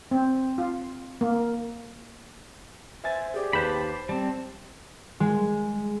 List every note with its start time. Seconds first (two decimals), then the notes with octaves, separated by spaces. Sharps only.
0.11 C4
0.58 F4
1.21 A#3
3.04 C5 E5 G#5 A6
3.34 G4 G#4 D5
3.53 D#2 B4 C5 A5 B5 G6
4.09 G3 C4 A5
5.20 G#3